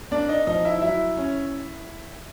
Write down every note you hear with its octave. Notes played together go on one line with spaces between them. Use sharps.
A#3 D4 D5
D#4 D#5
F3 D#4 D#5
E4 E5
F#3 E4 E5
C#4